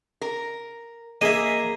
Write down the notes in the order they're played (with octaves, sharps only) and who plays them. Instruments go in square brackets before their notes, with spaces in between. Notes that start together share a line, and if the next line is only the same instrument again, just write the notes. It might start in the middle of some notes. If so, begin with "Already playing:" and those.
[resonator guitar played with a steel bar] A#4
[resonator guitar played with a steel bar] A#3 G#4 [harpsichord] D#5 E5